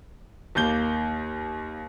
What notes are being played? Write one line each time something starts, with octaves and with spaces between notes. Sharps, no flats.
D#2 A#3 G6 G7